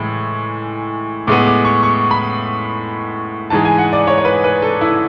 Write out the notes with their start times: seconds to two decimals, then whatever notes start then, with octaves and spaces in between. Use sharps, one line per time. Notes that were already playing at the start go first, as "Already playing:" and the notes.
Already playing: A2 E3 G#3 B5
1.27 A2 G#3 B3 D6
1.47 D6
1.65 C#6
1.83 C#6
2.11 B5
3.50 G#2 E3 G#3 A5
3.65 G#5
3.78 F#5
3.93 D5
4.07 C#5
4.18 C#5
4.25 B4
4.44 B4
4.62 A4
4.81 E4